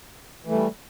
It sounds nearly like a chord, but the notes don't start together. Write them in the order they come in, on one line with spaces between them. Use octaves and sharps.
E3 A3 G3